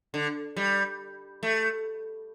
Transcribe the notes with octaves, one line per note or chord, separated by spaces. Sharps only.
D3
G3
A3